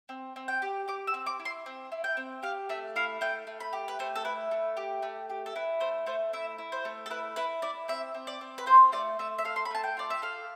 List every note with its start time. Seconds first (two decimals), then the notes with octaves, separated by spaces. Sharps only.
0.09 C4
0.36 C4
0.48 G5
0.62 G4
0.88 G4 D6
1.07 E6
1.14 C4
1.26 D6
1.40 E4
1.45 C6
1.66 C4
1.92 E4
2.04 G5
2.17 C4
2.43 G4 F5
2.69 A3 E5
2.96 E4 F5
3.21 A3 G5
3.47 A3
3.60 B5
3.73 G4
3.88 B4
3.99 A3 C5
4.15 A4
4.25 E4 B4
4.51 A3
4.77 G4
5.02 A3
5.30 G4
5.46 A4
5.55 E4 B4
5.80 A3 C5
6.06 A3 C5
6.33 E4 E5
6.58 E4
6.72 C5
6.85 A3
7.06 A4
7.10 E4 B4
7.36 E4 B4
7.62 E4 D5
7.88 C4 E5
8.14 C4
8.27 D5
8.41 C4
8.58 B4
8.66 F4 C5
8.92 A3 D5
9.19 A3 E5
9.38 E5
9.45 A4 F5
9.56 C6
9.65 B5
9.71 A3 A5
9.84 G5
9.97 F4 D5
10.10 E5
10.22 A4 F5